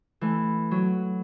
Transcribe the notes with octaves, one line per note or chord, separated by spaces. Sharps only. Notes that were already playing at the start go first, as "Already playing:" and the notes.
E3 A3
F#3